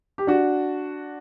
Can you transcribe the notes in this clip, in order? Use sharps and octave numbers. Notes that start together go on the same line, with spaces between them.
G4
D4 F#4